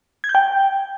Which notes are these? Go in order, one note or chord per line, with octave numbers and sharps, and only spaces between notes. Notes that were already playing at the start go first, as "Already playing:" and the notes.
G#6
G6
G5